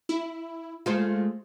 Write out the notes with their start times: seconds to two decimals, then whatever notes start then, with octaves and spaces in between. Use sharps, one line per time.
0.09 E4
0.86 G#3 A3 F4 C5